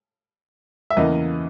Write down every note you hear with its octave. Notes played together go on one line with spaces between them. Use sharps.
E5
E2 C#3 E3 A#3 D#5